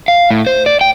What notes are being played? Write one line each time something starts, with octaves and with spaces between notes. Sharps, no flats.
F5
A2
C5
D5
G5